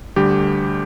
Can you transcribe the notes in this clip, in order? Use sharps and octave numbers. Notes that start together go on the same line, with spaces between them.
D2 D3 G3 G4